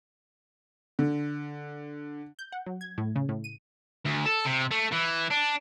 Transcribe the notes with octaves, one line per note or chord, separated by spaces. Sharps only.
D3
G6
F#5
F#3
G#6
A2
C#3
A2
D#7
D2
A4
C3
A3
E3
D4